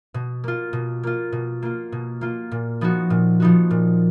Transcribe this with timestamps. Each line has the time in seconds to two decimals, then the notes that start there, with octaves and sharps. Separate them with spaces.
0.14 B2
0.44 A#3 F4
0.73 B2
1.03 A#3 F4
1.32 B2
1.62 A#3 F4
1.92 B2
2.21 A#3 F4
2.52 A#2
2.81 F3 B3 D#4 F#4
3.10 A#2
3.40 F3 B3 D#4 F#4
3.70 A#2